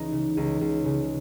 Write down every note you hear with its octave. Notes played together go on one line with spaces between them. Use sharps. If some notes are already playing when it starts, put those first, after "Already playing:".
Already playing: C#2 E3 D#4
C#3
C#2 D#4
C#2
C#3